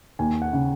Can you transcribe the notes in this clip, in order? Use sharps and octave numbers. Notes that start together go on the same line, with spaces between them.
D#2 G#5
F#5
C#3